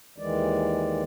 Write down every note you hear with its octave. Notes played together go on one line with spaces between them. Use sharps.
D#2 D#3 E3 G#3 D5